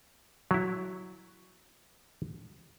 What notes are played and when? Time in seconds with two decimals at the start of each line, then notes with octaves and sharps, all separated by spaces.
0.51 F#3 E4